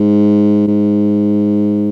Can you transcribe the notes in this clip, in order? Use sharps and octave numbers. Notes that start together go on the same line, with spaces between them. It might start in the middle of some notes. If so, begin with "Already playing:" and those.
Already playing: G#2
G#2